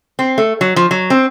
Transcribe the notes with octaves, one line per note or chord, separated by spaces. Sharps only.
C4
A3
F#3
F3
F#3
C4